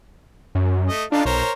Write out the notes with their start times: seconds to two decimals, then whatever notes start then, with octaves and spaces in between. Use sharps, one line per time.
0.55 F#2
0.88 A3 D#5
1.12 D4 D#4 F4 A4
1.25 B1 A#4 C5 C#5